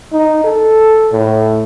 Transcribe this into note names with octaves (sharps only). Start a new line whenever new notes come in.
D#4
A4
A2